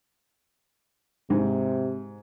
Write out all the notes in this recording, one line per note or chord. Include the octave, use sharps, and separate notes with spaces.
G#2 C3